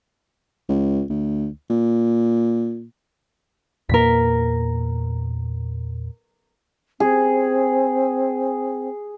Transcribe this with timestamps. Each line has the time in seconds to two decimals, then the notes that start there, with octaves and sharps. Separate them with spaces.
0.69 C#2
1.10 D2
1.70 A#2
3.89 E2 A#2 A#3 A#4 B6
7.00 C4 G#4